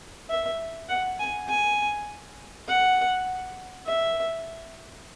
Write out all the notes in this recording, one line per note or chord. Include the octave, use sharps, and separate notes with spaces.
E5
F#5
G#5
G#5
F#5
E5